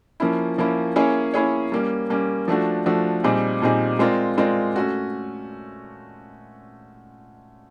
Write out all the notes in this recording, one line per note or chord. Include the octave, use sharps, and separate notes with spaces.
F3 A#3 C#4 E4
F3 A#3 C#4 E4
A#3 C#4 E4 G#4 C#5
A#3 C#4 E4 G#4 C#5
G3 A#3 C#4
G3 A#3 C#4
F3 A3 D4 F#4
F3 A3 D4 F#4
A#2 G3 C4 D#4 G#4
A#2 G3 C4 D#4 G#4
G#3 C4 F4 A#4 D5
G#3 C4 F4 A#4 D5
A3 C#4 F#4